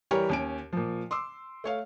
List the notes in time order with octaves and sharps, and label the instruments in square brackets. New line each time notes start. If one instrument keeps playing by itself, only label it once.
[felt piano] E3 G3 G4 A#4 C#5
D#2 C#4 D7
A#2 F3
C6 D6 E6
A3 C#5 F5